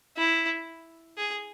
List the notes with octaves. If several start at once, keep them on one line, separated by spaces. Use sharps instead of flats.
E4
G#4